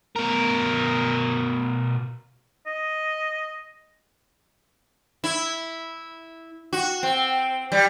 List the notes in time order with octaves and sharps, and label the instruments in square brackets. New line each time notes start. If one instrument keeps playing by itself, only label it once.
[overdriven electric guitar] B2 A#4
[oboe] D#5
[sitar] E4
F#4
C4
G3